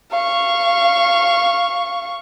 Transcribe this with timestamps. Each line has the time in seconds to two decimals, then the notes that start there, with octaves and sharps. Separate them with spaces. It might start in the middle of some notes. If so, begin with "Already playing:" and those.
0.11 F5 C#6